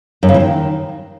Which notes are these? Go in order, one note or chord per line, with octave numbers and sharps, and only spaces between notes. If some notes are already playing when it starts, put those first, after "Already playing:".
F#2
C#3
E3
D#3